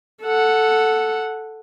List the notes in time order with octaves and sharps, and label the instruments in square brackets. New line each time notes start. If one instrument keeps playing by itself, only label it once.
[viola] A4 F#5